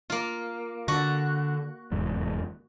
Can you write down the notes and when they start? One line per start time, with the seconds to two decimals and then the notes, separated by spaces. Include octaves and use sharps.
0.10 A#3 F4
0.88 D3 F#4
1.92 F1 E2 G#2